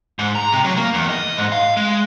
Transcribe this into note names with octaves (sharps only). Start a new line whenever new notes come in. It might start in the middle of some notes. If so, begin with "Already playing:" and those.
G#2
A#5
C3
F#3
A#3
E2
D#5
G#2
F5
G#3